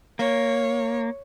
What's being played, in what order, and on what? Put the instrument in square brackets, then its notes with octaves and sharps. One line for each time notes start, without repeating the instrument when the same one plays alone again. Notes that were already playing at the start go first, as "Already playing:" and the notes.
[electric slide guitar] A#3 [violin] C#5